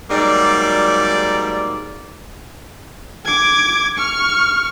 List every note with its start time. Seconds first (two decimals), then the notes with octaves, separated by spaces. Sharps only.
0.10 G#2 F#3 G3 A#3 D5
3.25 D6 G#6
3.98 C#6 F6